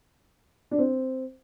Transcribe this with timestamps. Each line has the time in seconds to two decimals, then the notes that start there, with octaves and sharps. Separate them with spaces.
0.71 D4
0.78 C4